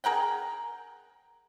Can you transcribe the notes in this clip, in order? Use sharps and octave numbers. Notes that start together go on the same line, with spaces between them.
G#4 A#4 F#5 G5